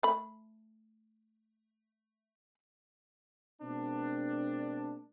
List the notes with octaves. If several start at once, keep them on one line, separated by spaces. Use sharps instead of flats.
A3 B5
B2 G#3 A#3 C4 D4